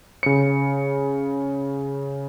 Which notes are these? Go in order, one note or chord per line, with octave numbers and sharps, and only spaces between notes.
C#3 C#7